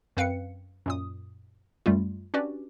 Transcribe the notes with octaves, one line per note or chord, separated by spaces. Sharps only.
F#2 C4 B4 F5 G5 C#7
F#2 A#2 D#6
F#2 G3 A3 F4
C#4 D4 F#4 G4 B4 D5